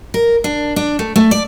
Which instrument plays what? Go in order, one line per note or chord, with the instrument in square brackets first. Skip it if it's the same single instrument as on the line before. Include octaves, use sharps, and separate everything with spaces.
[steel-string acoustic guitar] A#4
D4
D4
A3
A3
D5